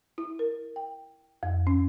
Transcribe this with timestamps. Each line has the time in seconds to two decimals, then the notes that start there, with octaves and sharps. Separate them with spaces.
0.18 E4
0.39 A#4
0.76 G5
1.43 F2
1.67 C#4